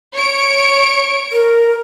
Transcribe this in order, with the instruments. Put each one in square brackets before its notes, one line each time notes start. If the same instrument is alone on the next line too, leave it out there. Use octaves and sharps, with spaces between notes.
[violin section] C#5 C#6 D7
[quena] A#4